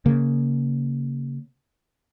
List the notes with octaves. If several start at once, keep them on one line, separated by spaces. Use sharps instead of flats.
C#3 A#3